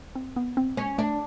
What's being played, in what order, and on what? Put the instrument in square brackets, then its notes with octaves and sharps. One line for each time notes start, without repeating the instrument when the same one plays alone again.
[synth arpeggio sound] C4
B3
C4
[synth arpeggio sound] G#3 [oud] C#4
[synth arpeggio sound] A3 [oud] D4